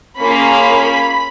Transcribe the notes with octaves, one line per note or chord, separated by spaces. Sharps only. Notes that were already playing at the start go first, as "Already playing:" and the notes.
A#3 C#4 F4 G#4 B5